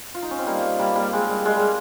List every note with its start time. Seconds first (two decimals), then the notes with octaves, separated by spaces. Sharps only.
0.15 F4
0.22 D#4
0.31 C#4
0.39 C4
0.46 G3 A#3
0.79 G3 A#3
0.96 G3 A#3
1.13 G#3
1.29 G3
1.46 G#3
1.56 G3